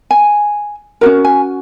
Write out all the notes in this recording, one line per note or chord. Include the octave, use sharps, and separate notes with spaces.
G#5
C#4 F#4 A#4 A#5
G#5